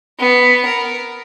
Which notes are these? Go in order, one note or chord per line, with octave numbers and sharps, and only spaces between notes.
B3
A#4